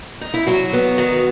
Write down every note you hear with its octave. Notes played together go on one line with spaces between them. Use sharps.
D#4
E4
F#3 F#4
B3
D#3